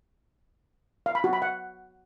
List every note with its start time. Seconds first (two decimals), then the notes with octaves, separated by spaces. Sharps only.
1.06 F5
1.15 B5
1.24 F#4
1.33 B5
1.42 F#5